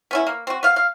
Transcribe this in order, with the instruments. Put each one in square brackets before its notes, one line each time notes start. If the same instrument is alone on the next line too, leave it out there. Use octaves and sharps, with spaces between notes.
[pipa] B3 C#4 E4
A#3
C4 F#4
B3 F5
F5